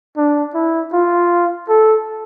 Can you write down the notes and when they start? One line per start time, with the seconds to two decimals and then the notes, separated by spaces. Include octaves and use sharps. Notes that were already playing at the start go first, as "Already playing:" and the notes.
0.17 D4
0.55 E4
0.93 F4
1.69 A4